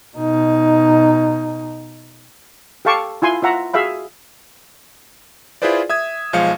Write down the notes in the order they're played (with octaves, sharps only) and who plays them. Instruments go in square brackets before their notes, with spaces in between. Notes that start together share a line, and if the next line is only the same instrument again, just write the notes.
[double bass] B2 D#4
[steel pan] G4 A4 F5 A5 C#6 D6
E4 F4 G#5 C6
F4 E5 F#5 A#5
F#4 G#4 E5 F5 B5
[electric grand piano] E4 F4 G#4 B4 C5 D5
E5 D#6 G#6
B1 F3 G#3 F5 C#7